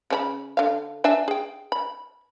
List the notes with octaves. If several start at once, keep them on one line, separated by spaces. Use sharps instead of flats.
C#3 C#4 B5
D3 F5
D4 E5 G#5
G#4 G5
B5